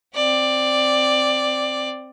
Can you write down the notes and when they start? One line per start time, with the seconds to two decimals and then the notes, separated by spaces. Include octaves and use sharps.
0.15 C4 D5